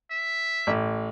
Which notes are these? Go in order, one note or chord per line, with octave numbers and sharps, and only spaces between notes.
E5
A1